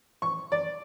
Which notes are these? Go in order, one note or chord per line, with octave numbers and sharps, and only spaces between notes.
C#6
D5